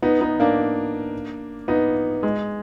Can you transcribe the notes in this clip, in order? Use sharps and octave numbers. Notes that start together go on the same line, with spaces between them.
B3 D#4
B3 D#4
A#3 D4
B3 D#4
G#3